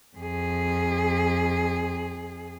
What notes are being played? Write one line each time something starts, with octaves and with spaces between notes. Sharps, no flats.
F2 G#4